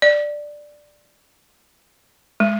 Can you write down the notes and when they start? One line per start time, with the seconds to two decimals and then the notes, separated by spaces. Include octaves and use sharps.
0.02 D5
2.40 G#3